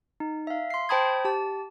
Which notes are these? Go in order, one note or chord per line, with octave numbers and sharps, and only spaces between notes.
D#4
E5 F5
C6 C7
C5 G5 A5 B5 D#6 G#6
G4 A5